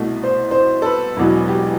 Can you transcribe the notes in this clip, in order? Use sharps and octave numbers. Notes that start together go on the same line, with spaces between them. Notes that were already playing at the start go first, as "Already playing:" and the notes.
Already playing: C2 B2 A3
C5
C5
A4
B4
E1 E2 B2 F#3
G4